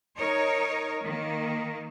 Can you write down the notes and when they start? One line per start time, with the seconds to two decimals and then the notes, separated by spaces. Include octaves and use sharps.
0.17 D#4 A#4 C#5
1.04 D#3 A#3